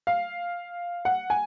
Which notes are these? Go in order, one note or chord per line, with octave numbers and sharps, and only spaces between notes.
F5
F#5
G#5